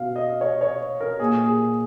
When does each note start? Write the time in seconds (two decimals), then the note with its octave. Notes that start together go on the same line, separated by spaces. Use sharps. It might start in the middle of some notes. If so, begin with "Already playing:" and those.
Already playing: B2 F5
0.16 D#5
0.41 C#5
0.61 C#5
1.01 A#4
1.19 A#2 G#4
1.46 G#4